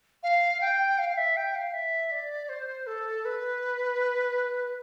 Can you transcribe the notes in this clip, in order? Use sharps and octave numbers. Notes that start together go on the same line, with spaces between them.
F5
G5
F5
F5
E5
G5
F5
E5
D5
C5
A4
B4